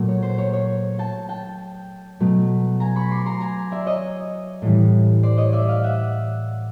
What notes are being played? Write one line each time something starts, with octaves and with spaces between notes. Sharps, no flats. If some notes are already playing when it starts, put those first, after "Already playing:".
Already playing: A#2 F#3 A3
C#5
C5
C#5
C#5
G5 A5
G5 A5
B2 F#3 A3
G#5 A#5
B5 C#6
C6 D6
A#5 C6
G#5 A#5
D5 E5
C#5 D#5
A2 E3 G3
C5 D5
C#5 D#5
D5 E5
D#5 F5
E5 F#5